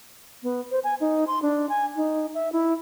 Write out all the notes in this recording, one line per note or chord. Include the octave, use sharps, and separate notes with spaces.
B3
C5
G#5
D#4
C6
D4
G#5
D#4
E5
E4